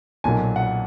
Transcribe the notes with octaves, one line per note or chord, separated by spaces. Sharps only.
B1 A#2 F#3 G#5
F#5